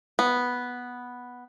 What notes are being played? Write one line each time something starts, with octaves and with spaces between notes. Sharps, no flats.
B3